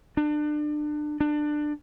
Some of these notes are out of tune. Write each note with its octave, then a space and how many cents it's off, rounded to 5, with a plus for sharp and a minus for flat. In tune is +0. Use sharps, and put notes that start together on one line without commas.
D4 +30
D4 +20